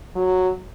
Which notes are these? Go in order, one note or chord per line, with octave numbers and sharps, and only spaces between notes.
F#3